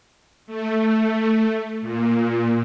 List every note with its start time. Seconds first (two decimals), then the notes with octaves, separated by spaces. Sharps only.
0.47 A3
1.81 A#2